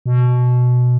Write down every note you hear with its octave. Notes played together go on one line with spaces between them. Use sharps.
B2